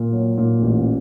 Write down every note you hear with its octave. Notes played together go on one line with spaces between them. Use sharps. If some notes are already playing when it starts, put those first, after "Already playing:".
Already playing: A#2
F#3
A#2
A1